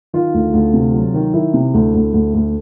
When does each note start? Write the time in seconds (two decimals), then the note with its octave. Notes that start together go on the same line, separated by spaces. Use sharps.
0.14 D#3 F4
0.34 D2
0.53 D2
0.74 C3
0.94 F#3
1.14 D#3
1.34 D#3 E4
1.54 C3
1.74 D2
1.94 D2
2.14 D2
2.34 D2